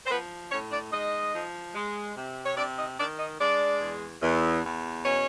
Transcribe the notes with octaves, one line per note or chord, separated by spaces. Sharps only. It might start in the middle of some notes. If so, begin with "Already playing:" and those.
C5
F3 B3 B4
A2 C#4 C#5
D4 D5
G#3 D#4 D#5
F3
G#3
C3
C#5
C3 D4 D5
D#4 D#5
D#3 D4 D5
D#4 D#5
G#3 D4 D5
E2
E2
E2
B2 C#4 C#5